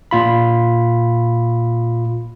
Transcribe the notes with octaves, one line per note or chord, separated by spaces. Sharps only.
A#2 F4 B5